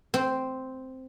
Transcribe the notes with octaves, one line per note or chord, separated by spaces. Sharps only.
C4